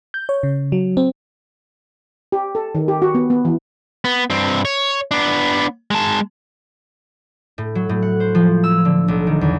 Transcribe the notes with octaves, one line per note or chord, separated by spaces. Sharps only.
G6
C#5
C#3
F#3
C4
G4
A4
D#3
G4
F#4
B3
B3
E3
B3
G2 C4
C#5
B3 D4
G#3 A5
A2
F#3
A2
F#5
C5
F3
E6
D3
B1
D#3
E2